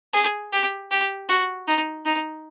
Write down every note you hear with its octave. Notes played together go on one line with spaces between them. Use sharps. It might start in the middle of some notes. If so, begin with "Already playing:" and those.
G#4
G4
G4
F#4
D#4
D#4